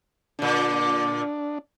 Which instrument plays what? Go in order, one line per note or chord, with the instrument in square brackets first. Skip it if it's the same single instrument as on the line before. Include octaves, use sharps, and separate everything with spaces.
[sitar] A#2 D3 [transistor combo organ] D4